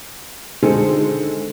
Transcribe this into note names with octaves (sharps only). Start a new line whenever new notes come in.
D3 D#3 G#3 C4 A4